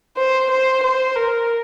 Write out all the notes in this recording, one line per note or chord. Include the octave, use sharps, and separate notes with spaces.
C5
C5
C5
A#4